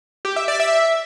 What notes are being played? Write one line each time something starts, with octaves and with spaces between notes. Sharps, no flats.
G4
E5
D5
E5